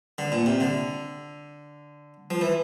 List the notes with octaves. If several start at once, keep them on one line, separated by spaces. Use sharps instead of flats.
D3
A#2
C3
D3
F3
E3